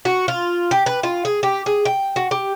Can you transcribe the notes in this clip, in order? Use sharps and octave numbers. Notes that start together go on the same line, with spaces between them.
F#4
F4
G4
B4
F4
G#4
G4
G#4
G5
F#4
G4